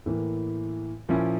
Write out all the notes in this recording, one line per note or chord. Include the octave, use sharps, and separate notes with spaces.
A2 E3 A#3
A#2 F3 C#4 E4